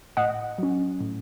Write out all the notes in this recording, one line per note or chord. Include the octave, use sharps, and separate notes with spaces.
A2 D#5 F#5
F#3 C#4
A2